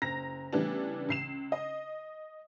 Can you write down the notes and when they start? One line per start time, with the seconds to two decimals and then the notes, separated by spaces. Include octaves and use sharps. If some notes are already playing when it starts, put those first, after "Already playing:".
0.02 F#1 A#5 A#6
0.53 C#3 E3 G3 A3 B3 D4
1.09 C#2 C7 E7
1.52 D#5